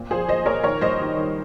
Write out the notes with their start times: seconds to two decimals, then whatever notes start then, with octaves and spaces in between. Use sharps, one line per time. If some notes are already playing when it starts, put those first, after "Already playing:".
Already playing: A#2 C4
0.11 F3 G#4 C5
0.28 F3 C5 D#5
0.46 A#2 A#4 C#5
0.63 D#3 A#4 C#5
0.81 G2 C5 D#5
0.99 D#3
1.17 D#3